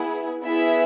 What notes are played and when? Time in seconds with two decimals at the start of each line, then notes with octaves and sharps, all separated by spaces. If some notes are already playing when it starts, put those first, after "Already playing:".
Already playing: B3 E4 G#4
0.43 B3 E4 G#4 E5